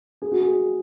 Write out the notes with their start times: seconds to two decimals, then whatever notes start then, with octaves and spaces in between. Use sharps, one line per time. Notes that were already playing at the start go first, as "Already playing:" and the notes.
0.22 G#4
0.32 F#4
0.41 G#4